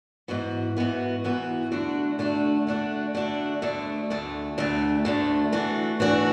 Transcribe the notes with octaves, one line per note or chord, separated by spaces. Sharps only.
G#2 E3 B3 F#4
G#2 E3 B3 F#4
G#2 E3 B3 F#4
D3 A3 D4 F#4
D3 A3 D4 F#4
D3 A3 D4 F#4
D3 A3 D4 F#4
D2 D3 A3
D2 D3 A3
D2 D3 A3
D2 D3 A3
E3 A3 D4 F#4
E3 A3 D4 F#4